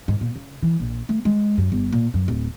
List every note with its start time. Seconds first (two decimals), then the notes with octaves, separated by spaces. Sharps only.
0.08 G#2
0.21 A#2
0.36 C#3
0.63 E3
0.80 A#1
1.09 A3
1.25 G#3
1.58 F#2
1.72 G1
1.92 A#2
2.14 F#2
2.28 D1